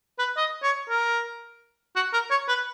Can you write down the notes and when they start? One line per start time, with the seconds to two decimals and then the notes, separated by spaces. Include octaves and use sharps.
0.19 B4
0.37 D#5
0.63 C#5
0.90 A#4
1.96 F#4
2.13 A#4
2.31 C#5
2.48 B4